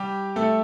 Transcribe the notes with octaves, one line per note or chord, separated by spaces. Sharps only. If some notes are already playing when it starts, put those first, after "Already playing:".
Already playing: G3 G4
A3 A4